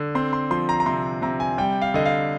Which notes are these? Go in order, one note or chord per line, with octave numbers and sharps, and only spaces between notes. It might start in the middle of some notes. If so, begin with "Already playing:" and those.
Already playing: D3
C4 C6
C6
F3 C6
A#5
A#5
C3 C6
C3 A#5
G#5
G3 G5
F5
D3 D#5
F5